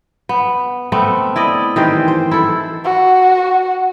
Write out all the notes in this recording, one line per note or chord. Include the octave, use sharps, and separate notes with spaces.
B3
A3 B3 C4
E4 D5 D#5
D#3 E3 G4 C5
C5
E4 A4
F#4